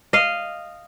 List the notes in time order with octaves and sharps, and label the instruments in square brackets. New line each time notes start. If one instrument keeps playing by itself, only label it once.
[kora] D#5 F5